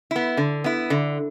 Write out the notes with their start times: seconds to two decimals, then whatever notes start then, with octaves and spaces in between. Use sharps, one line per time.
0.11 B3 E4
0.37 D3
0.64 B3 E4
0.90 D3